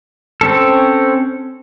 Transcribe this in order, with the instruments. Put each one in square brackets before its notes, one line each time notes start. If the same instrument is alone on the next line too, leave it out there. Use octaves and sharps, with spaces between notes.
[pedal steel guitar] C4 C#4 A4